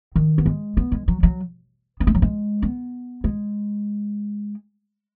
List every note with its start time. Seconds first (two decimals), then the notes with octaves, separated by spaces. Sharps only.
0.16 D#3
0.38 B3
0.46 G#3
0.77 B3
0.92 G#3
1.08 F#3
1.23 F#3
2.00 B3
2.07 G#3
2.15 F#3
2.22 G#3
2.62 B3
3.24 G#3